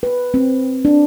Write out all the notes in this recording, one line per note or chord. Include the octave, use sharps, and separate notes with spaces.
B4
C4
D4